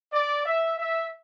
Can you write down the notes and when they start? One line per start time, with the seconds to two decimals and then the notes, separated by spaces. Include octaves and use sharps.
0.12 D5
0.46 E5
0.79 E5